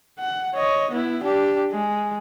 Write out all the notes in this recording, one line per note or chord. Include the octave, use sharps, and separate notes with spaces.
F#5
C#5 D#5
B3 E4
D4 G4
G#3